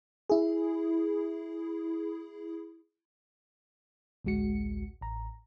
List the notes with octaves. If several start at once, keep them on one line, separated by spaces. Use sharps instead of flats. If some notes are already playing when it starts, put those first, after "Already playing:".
E4 G#4
A1 D2 G#3 F#4 C#7
A1 A#5